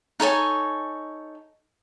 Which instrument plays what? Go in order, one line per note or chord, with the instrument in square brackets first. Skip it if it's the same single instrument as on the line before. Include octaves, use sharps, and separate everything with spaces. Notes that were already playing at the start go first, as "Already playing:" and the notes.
[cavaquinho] D#4 A4 C#5 G#5